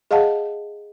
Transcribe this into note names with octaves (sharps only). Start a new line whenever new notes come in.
G#4 D#5 F5 F#5 A5